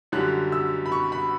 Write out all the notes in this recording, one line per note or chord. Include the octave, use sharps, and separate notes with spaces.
F#2 D3 G3 F#6
E6
B5
C#6
B5